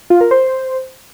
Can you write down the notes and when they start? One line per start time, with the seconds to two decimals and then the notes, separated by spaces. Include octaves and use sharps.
0.10 F4
0.21 A#4
0.31 C5